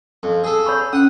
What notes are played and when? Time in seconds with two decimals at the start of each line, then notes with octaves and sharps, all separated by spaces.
0.23 F2
0.44 G#4 A4
0.66 C#5 B5 C#6
0.93 C#4 F#5 D#6